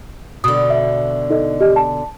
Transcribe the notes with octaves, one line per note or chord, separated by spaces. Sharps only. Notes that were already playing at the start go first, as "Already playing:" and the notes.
B2 D3 D#6
E5
D#4 A4 D#5
G4 D#5
A5